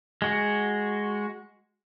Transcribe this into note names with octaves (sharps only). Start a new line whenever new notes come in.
G#3 F#4